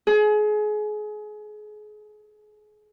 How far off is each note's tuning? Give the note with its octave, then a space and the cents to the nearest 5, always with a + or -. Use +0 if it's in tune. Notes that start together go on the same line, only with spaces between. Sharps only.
G#4 +30